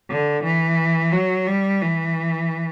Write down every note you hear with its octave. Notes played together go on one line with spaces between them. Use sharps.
D3
E3
F#3
G3
E3